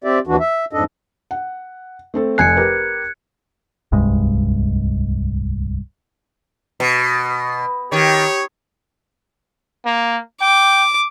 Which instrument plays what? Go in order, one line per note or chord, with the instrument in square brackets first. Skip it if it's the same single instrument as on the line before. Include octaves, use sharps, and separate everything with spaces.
[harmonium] C4 G4 D5 E5
D#2 E3 D4 F#4
E5
F2 G#2 D4 A4 D#5
[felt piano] F#5
A3 C4 A4
[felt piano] F1 G#5 C7 [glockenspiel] F#6 G#6 C#7
[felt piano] G4 A#4 B4
[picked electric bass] D1 C2 G2 G#3
[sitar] B2
[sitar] D#3 [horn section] G4 C#5
[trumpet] A#3
[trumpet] G5 [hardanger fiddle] D6